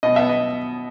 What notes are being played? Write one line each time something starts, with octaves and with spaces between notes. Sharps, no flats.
B2 D#5
B3 E5
D#5